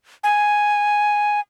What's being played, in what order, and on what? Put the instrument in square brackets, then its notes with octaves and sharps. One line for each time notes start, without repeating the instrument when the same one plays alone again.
[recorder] G#5